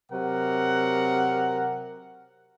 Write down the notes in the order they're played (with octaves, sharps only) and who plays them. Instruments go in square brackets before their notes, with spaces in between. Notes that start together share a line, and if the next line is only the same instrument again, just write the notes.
[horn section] C3 F#3 A#4 F#5